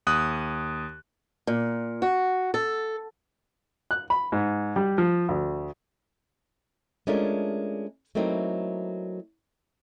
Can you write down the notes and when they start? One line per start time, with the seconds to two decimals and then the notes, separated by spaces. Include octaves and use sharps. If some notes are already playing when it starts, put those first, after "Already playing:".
0.07 D#2 D#6 F#6
1.47 A#2
2.02 F#4
2.54 A4
3.91 F#6
4.10 B5
4.32 G#2
4.76 G3
4.98 F3
5.29 D2
7.07 G#3 A3 C#4 D4 F4 A#4
8.15 F#3 A3 A#3 C4 D#4 E4